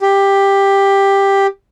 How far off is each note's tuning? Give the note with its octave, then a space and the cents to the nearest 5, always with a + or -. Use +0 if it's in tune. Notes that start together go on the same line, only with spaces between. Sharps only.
G4 +10